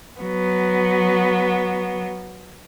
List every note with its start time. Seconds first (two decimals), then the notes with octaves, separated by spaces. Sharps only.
0.21 F#3 B3